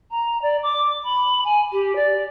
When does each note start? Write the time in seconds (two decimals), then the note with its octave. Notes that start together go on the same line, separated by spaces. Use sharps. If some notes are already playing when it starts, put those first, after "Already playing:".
0.11 A#5
0.42 D5
0.63 D6
1.04 B5
1.44 G#5
1.72 G4
1.96 D5